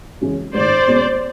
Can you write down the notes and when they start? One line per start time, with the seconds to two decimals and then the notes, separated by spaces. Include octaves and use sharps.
0.21 F#2 C#3 E3 G#3
0.54 A1 G#2 D#3 C5 D5
0.88 B2 G#3 C#4